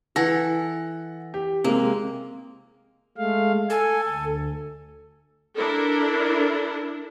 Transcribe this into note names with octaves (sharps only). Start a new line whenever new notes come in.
E3 A4 F#5 A#6
G4
C3 G#3 A#3
G#3 A3 F5
A4 G#5
D2
D4 E4 A4 A#4